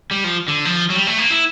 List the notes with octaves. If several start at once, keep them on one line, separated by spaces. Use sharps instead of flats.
G3
F3
D3
F3
F#3
G3
A3
A#3
E4